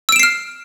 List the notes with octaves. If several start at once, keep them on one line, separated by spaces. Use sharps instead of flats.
E6 F6 C7 D7 E7